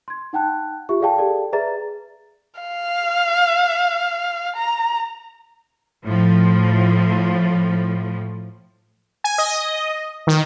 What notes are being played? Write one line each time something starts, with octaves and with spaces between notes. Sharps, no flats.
C6 G#6
D#4 F#5 G5 A5 F#6
F4 G4 E5 C#6
G#4 A4 D5 F5 G5 A5
G4 A4 D5 F5 G5 A5
G#4 B4 D5 E5 A#5 A6
F5
A#5
A2 F3
G#5
D#5
D#3